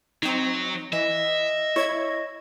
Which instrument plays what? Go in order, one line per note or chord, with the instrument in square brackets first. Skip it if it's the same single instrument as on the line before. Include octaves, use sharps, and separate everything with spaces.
[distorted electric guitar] F#3 [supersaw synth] C4 D#4
[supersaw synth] E3 [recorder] D#5 [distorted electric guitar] E5
[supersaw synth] E4 G#6 [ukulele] C#5